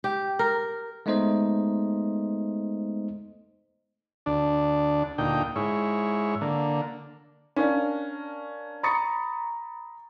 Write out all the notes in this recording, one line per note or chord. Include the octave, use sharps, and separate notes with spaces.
G4
A#4
G#3 A3 B3 D#4 C5 D#5
D2 D4
D2 A#2 D#4 G5
G#2 E4 C#5
D3 A#3
C#4 D4 A#4 F5
A#5 B5 C#6 D#6 A6 C#7